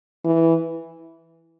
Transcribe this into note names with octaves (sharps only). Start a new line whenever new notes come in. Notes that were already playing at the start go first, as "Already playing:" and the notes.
E3